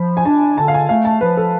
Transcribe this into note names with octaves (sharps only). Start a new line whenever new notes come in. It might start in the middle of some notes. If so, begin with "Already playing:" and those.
Already playing: F3 B5
G#5
D4 A5
D3 A5
F5
G#5
A3 F5
A5
F3 B4
A4